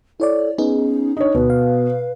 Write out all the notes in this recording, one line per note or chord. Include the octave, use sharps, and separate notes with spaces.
E4 A4 C#5 D5
B3 C#4 D#4 G#4
D4 D#4 C#5
D2 B2 B4
F5